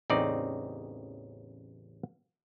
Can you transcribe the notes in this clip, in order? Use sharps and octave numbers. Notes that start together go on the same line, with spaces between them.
A1 E2 C#3 C4 D#4 D5